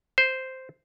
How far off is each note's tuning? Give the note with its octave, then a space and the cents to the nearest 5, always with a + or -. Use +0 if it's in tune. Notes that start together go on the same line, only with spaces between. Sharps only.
C5 -5